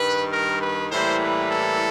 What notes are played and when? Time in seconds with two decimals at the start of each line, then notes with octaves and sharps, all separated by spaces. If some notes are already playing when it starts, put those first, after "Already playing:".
Already playing: G2 D#3 G3 B4
0.31 A#4
0.62 B4
0.91 A2 E3 G3 A#3 C5
1.22 B4
1.51 A4